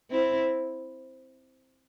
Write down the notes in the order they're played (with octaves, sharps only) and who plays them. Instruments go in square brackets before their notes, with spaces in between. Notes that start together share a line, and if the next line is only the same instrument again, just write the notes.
[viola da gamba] C4 E4